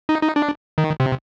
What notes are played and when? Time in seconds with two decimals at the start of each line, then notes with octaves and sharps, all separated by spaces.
0.09 D#4
0.22 D#4
0.36 D4
0.78 D#3
1.00 C3